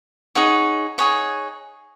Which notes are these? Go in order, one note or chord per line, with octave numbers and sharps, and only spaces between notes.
D#4 G#4 C#5 F#5
D#4 G#4 C#5 F#5